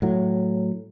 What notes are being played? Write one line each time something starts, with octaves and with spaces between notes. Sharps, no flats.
A2 F#3